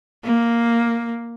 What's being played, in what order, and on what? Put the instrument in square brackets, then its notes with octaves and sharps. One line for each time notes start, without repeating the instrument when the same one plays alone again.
[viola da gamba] A#3